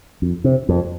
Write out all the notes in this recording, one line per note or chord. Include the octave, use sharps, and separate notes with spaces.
F2
C3
F2